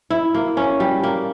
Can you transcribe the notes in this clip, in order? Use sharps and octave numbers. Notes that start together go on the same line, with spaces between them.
E4
A#3
C#4
G3
A#3